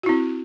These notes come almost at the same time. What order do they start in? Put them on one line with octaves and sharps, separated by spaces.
F#4 E4 C4